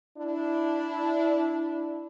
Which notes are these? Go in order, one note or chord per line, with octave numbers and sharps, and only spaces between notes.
D4 E4